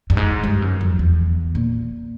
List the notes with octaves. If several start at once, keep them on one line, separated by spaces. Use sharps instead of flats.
G2
G#2
G2
F#2
F2
E2
A#2